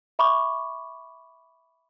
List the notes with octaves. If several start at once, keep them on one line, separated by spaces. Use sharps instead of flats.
E5 B5 C#6 D6